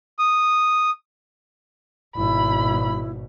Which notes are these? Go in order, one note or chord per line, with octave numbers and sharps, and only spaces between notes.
D#6
G#1 B2 E4 B5